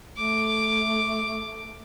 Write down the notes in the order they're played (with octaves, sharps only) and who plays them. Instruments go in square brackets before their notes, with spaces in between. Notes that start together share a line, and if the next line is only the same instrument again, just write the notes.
[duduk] A3 [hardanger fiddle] D6